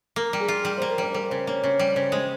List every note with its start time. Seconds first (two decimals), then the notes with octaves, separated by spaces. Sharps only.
0.16 A#3 A#4
0.33 G3
0.40 G#4
0.48 F4
0.65 G3
0.78 A#3 C5
0.90 A#4
0.98 G3 C5
1.14 G3 A#4
1.30 C#3 C5
1.47 A#3 C#5
1.63 C#3 C#5
1.79 G3
1.95 C#3 C5
2.12 G#3 C5